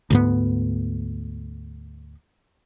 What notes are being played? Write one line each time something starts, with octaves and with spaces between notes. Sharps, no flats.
D2 G#2 B3